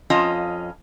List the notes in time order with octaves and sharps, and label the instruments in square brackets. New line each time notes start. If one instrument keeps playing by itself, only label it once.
[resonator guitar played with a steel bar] F2 C#4 F4 D#5 A5